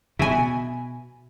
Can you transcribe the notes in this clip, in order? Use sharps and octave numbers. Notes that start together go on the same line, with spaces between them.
B2 E5 G#5